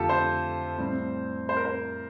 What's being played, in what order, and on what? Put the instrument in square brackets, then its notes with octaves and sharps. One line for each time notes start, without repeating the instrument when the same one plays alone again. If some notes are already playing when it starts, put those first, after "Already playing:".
Already playing: [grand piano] F2 D3 A3 F4 G4 A4
C5
A2 G3 C4
C5
A#4
C5